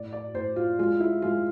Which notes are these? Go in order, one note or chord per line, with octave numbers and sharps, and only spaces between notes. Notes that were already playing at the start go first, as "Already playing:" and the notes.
Already playing: A2 D5
D5
A2 C5
F4
G#3 F4
E4
G#3 F4